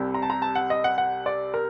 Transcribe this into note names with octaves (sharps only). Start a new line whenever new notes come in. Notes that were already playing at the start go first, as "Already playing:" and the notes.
Already playing: C2 C3 G3
A#5
A5
A#5
A5
F#5
D#5
F#5
F#5
D5
A#4